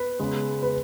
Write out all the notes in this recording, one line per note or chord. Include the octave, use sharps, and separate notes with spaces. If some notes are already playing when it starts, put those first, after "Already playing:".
Already playing: B4
C#3 G#3 B3
B4